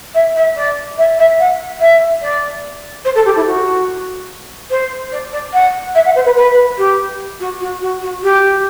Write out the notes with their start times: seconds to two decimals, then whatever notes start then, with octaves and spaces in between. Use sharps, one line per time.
0.14 E5
0.35 E5
0.56 D5
0.98 E5
1.18 E5
1.39 F#5
1.80 E5
2.21 D5
3.05 C5
3.15 A4
3.25 G4
3.36 E4
3.46 F#4
4.70 C5
5.12 D5
5.33 D5
5.53 F#5
5.95 E5
6.05 F#5
6.15 C5
6.25 B4
6.36 B4
6.78 G4
7.40 F#4
7.61 F#4
7.81 F#4
8.02 F#4
8.23 G4